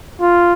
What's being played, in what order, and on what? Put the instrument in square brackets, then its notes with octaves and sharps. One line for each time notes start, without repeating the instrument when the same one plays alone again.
[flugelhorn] F4